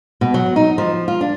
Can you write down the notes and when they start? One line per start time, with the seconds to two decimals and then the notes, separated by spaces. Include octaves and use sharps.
0.21 B2
0.34 F#3
0.56 D#4
0.78 F3
1.08 F4
1.21 D4